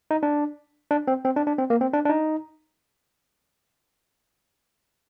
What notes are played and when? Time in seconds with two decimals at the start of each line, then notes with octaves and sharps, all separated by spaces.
0.11 D#4
0.23 D4
0.91 D4
1.08 C4
1.25 C4
1.36 D4
1.47 D4
1.58 C4
1.70 A#3
1.81 C4
1.94 D4
2.05 D4
2.09 D#4